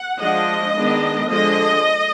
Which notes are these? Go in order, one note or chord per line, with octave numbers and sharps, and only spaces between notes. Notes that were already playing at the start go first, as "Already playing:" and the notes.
Already playing: F#5
F3 G#3 D4 D#5
D#3 G#3 B3 D4
D3 F3 G#3 D4 D#5